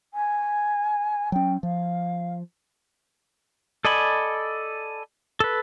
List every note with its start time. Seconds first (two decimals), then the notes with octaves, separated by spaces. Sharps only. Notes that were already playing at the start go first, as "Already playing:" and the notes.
0.13 G#5
1.32 F#3 C#4 G5
1.63 F3 F5
3.85 A4 D5 D#5 G#5 B5
5.40 A4 B4